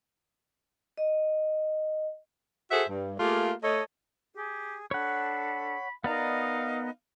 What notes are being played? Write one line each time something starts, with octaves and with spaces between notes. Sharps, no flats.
D#5
F#4 G#4 A4 C5 E5
G2
A3 A#3 F4 G4 G#4
A3 A4 C#5 D#5
G4 G#4
D4 A4 C#5 F#5 B5
B3 D#4 A#4 D5 D#5 F5 A#5